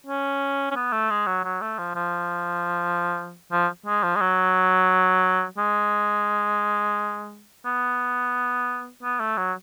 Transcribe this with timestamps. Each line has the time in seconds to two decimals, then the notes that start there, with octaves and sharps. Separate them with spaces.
0.07 C#4
0.71 C#4
0.75 B3
0.92 A3
1.10 G#3
1.26 F#3
1.44 F#3
1.61 A3
1.79 F3
1.95 F3
3.52 F3
3.86 G#3
4.03 F3
4.16 G#3
4.21 F#3
5.58 G#3
7.65 B3
9.03 B3
9.20 A3
9.37 F#3